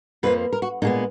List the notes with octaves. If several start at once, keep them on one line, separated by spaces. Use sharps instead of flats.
F2 F3 A#3 B4
A#4
F#4
A#2 G#3 B3 D#4